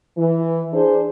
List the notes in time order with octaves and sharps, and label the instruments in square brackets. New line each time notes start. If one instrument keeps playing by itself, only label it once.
[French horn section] E3
D4 G#4 C5